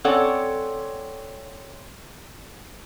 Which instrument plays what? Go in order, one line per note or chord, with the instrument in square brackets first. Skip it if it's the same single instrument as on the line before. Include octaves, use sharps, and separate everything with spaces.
[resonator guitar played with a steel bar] C4 C#4 A4 C#5 D5 F#5